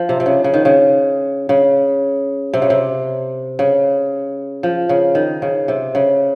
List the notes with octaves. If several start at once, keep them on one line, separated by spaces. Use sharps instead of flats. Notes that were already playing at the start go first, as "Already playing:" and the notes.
Already playing: F3
C3
C3
C#3
C#3
D#3
C#3
C#3
C3
C#3
C3
C#3
F3
C#3
D#3
C#3
C3
C#3